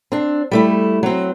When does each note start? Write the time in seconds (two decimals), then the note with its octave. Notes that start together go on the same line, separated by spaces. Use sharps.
0.12 C4 D4
0.51 G3 A3 E4
1.03 F#3 C4